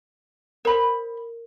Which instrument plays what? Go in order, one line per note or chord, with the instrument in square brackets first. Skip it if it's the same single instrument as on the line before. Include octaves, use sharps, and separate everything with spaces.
[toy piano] A#4 [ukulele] C5 B5